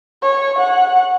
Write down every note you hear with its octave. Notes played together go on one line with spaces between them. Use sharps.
C#5
F#5